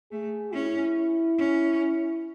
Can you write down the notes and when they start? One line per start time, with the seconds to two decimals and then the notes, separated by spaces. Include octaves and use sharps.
0.11 A3 G#4
0.53 C#4 E4
1.39 C#4